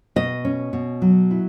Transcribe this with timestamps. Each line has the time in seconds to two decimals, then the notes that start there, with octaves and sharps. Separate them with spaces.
0.16 B2 D#5
0.45 C#4
0.73 B2
1.02 F#3
1.31 E4